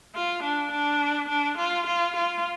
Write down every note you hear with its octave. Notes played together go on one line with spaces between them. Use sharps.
F4
D4
D4
D4
F4
F4
F4